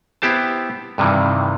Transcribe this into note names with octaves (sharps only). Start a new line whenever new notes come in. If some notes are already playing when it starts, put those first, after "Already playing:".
B3 E4 G4 C5 A5
G2 C3 D#3 E3